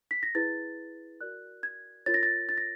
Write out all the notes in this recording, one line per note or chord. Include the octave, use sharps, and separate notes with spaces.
B6
A#6
E4 G#4 B4 A6
F#4 A#4 D5 F#6
G#6
F4 A#4 C#5 A6
A#6
A6
A6
A#6